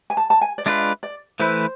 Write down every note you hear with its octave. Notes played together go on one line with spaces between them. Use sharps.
G#5
A5
A5
G#5
D5
G#3 D4 F4 B4 E5
D5
E3 A3 E4 B4 C5